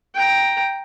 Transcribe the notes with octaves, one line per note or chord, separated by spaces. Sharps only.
G5 A#5